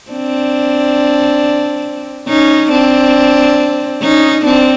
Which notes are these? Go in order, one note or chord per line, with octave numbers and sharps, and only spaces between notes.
C4 D4
C#4 D#4
C4 D4
C#4 D#4
C4 D4